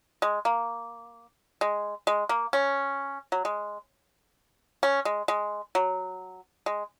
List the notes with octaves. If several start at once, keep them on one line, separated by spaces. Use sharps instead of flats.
G#3
A#3
G#3
G#3
A#3
C#4
F#3
G#3
C#4
G#3
G#3
F#3
G#3